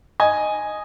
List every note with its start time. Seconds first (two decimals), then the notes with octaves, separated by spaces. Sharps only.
0.20 D#5 G#5